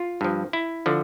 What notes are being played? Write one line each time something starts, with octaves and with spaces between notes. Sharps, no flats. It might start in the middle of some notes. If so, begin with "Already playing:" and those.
Already playing: F4
G2 F3
E4
D3 F3